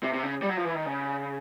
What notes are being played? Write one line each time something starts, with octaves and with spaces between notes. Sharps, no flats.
C3
C3
C#3
G3
F#3
F3
E3
D#3
C#3